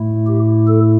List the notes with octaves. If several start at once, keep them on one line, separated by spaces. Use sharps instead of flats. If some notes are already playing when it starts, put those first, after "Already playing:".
Already playing: A2 A3 E4
G4
A4